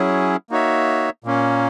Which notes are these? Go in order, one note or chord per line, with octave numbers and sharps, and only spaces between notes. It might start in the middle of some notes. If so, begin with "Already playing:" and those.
Already playing: F#3 C#4 E4 G#4
A#3 D#4 F#4 C#5 E5
A#2 A#3 C#4